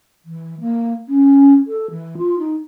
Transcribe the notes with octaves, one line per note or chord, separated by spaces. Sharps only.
E3
A#3
C#4
A4
E3
F4
D#4